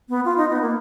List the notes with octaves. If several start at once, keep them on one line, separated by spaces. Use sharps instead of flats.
B3
F4
D#4
B3
A#3